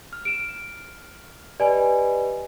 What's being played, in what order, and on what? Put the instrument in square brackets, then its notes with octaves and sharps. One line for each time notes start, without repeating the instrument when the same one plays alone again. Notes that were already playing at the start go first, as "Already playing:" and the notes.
[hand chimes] F6
[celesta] D7 E7
[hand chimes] G4 B4 D#5 [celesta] D5 G#5